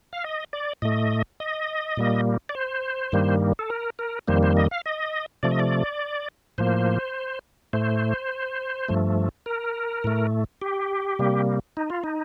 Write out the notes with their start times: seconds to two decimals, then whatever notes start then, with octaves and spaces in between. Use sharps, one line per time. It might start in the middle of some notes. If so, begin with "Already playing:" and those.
0.13 F5
0.24 D#5
0.53 D5
0.82 A2 A3 D#5
1.40 D#5
1.97 A#2 G3 A#3
2.49 D5
2.55 C5
3.12 G2 D#3 G3 A#3
3.59 A4
3.70 A#4
3.99 A#4
4.28 F2 D#3 G3 A#3 C5
4.43 C5
4.57 D#5
4.71 F5
4.86 D#5
5.43 C3 F3 A3 D5
5.51 D#5
5.59 D5
6.58 A2 F3 A#3 C5
7.73 A2 A3 C5
8.88 G2 F3 A3
9.46 A#4
10.04 A2 A3
10.62 G4
11.19 C3 G3 A#3
11.77 D#4
11.90 F4
12.04 D#4